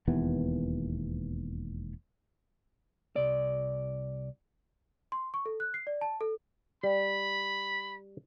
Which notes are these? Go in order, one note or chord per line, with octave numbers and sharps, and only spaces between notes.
E1 D#2 E3 B3
C2 D5
C6
C#6
A4
F#6
C7
D5
A5
A4
G3 B5